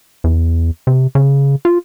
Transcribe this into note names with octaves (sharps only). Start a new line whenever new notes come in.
E2
C3
C#3
F4